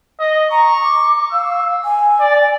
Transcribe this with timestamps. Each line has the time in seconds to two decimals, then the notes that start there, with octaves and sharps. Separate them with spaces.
0.19 D#5
0.51 A#5 C#6
0.83 D6
1.32 F5 E6
1.85 G#5
2.20 D5